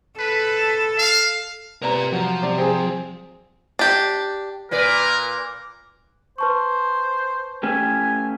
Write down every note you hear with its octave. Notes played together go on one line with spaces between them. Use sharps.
A4 B4
F5
C3 A#4 B4 D5 A#5
F3 F#3
C3 D5
C4 G#4
D4 G4
A#2 A#4 B4 D5
B4 C5 A5 C#6
A3 C#4 G4 G#5